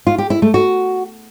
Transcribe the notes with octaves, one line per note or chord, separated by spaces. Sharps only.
F4
G4
E4
A3
F#4